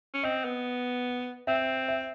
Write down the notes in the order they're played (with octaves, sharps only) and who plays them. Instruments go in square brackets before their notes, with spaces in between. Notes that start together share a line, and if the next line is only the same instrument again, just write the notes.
[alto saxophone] C#4
[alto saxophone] C4 [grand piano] D#5
[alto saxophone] B3
[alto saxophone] C4 [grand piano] E5
[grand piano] E5